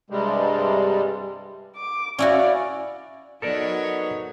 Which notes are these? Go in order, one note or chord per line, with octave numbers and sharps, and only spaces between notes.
G2 C3 G3 G#3
D6
C#4 E4 F#4 D5 F5
F#3 B3 D#4 A4 A#4 C#5 D5